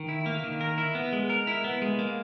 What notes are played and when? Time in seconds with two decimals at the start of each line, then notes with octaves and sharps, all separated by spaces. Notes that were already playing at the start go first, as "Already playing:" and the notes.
Already playing: D#3
0.09 E4
0.26 A#3
0.44 D#3
0.61 A#4
0.78 E4
0.95 B3
1.12 G#3
1.30 A#4
1.47 E4
1.64 B3
1.82 G#3
1.99 A#3